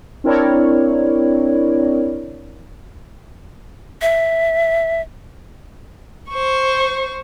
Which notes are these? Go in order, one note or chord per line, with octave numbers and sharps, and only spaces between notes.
C4 D4 E4 A#4 C#5 D5
E5
C5 C#6